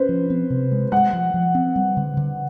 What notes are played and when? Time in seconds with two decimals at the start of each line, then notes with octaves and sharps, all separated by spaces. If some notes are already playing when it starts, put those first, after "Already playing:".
Already playing: C#4 B4 C5
0.09 F3
0.30 C4
0.50 C3
0.72 G#3
0.92 G#3 F#5
1.13 F3
1.34 F3
1.55 C4
1.76 G3
1.97 D3
2.17 D3